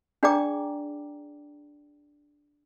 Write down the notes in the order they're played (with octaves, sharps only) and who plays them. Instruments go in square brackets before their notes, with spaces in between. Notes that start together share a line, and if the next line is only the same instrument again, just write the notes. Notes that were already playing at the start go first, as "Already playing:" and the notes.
[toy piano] D4 G#4 D5 G5 A#5 D6